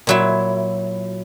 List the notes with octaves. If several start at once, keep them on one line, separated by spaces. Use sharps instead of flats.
A#2 F#3 E4